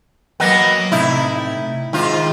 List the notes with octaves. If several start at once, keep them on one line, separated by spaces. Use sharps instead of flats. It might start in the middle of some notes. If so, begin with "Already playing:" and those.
F#3 A#3 B3 D#5 F#5
A2 C3 D#4 E4
G#2 D#3 F4